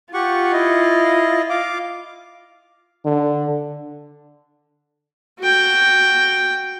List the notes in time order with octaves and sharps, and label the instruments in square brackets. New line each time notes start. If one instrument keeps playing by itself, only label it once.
[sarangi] F4 [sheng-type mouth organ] G4 F#5 C#6
[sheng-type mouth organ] E4 D#5
F5 D6
[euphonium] D3
[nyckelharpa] F#4 G5